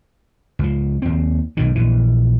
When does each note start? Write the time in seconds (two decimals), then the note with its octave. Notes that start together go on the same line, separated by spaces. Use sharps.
0.59 C#2 F3
1.02 D#2 C4
1.57 B1 G#2 D#3
1.75 A#1 E3